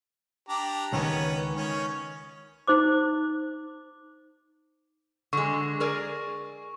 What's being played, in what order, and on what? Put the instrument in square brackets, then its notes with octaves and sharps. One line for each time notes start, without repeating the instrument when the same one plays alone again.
[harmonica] D4 G4 A#5
[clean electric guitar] C#2 D#3 [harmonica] B3 C#4
[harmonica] D#3 C#4
[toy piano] D#4 C5 D6
[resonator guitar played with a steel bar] D3 G#3 [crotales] C#6
[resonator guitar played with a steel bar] G#4 A#4 D5